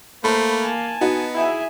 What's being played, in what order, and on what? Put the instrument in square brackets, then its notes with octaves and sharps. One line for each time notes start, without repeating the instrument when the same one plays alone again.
[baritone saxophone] A3 [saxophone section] A#3 [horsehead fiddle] C5 [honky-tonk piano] B5
[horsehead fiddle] G#5 A5
[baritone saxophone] B3 [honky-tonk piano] D#4 F#4
[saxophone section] E4 G#4 [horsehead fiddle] E5 G#5